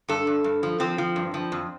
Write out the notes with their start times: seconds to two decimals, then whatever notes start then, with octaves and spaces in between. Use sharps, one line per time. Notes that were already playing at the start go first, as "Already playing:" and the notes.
0.08 G2 A4
0.27 G2
0.44 G2
0.63 F3
0.80 F3 C4
0.98 F3
1.16 G2
1.34 F3
1.52 F2